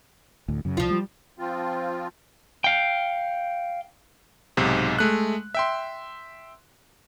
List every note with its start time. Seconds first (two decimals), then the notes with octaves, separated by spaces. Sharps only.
0.48 D2 A2
0.65 F#2 C#3
0.77 C2 F3 F4
0.91 G3
1.39 F3 C4 F4
2.64 F5 G5
4.57 B1 G#2 C3
4.99 G#3 A3 F#6
5.55 E5 G5 C6